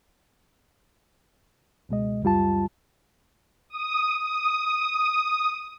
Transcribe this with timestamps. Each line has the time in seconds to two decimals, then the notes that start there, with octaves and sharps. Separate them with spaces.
1.89 C#2 B2 G#3 D#5
2.23 C#2 F#2 G3 F4 A5
3.69 D#6
4.20 D#6